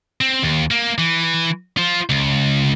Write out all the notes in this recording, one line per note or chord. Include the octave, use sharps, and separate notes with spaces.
C4
D#2
A#3
E3
F4 C5
C#2